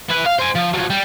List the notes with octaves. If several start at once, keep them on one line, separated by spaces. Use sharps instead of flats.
E4 B4
F5
C5 G#5
F3
F3 F#3
G3